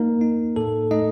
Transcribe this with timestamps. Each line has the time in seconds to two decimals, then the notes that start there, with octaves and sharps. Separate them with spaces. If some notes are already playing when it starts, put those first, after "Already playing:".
Already playing: A#3 D#4 A#4
0.21 D#4
0.56 A2 A4
0.91 A3 D#4 D#5